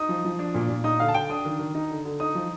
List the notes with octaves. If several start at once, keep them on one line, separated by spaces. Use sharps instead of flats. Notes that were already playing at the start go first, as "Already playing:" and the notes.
Already playing: D#4 D#6
F3
F3
D4
A#2
A#2
D#4 D#6
D3 F5
A5
D3 G5
D4 D#6
D#3
D#3
D#4
D3
D3
D#4 D#6
F3